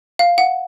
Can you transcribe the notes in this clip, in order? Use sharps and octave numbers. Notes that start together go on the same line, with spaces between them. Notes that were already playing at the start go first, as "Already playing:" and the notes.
F5
F#5